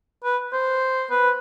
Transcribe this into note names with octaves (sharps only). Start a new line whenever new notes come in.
B4
C5
B4